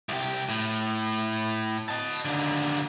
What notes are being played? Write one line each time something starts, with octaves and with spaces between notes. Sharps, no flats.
C2 G4
A2
D#5 A5
D#2 D3